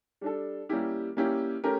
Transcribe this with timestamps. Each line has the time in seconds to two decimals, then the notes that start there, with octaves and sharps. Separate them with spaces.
0.21 G3 D4 A4
0.69 G3 A#3 C#4 E4 G4
1.17 G3 A#3 C#4 E4 G4
1.64 A3 C#4 G4 A#4